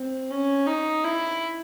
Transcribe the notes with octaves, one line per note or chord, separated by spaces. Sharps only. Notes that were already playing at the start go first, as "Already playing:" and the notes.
Already playing: C4
C#4
D#4
E4